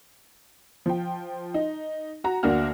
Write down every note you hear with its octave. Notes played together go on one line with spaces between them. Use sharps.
F3 G5
D#4
F#4 A#5
D2 A#3 D4 F#4 F6